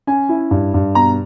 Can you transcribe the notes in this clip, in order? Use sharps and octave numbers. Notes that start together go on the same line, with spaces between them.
C#4 G#5
E4
G2
G2
B2 A#5